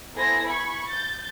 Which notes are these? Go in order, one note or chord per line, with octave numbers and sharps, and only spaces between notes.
B3 E4 G#4 A4 C5 A#6
B5 C#6 G#6
G6 A6